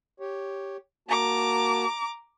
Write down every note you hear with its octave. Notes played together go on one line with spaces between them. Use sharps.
G4 C#5
A#3 F#4 A5 A#5 D6